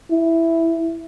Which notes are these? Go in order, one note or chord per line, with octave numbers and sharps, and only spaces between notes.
E4